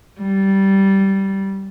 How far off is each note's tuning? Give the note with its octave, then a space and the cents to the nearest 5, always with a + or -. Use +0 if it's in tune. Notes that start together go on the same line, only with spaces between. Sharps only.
G3 -15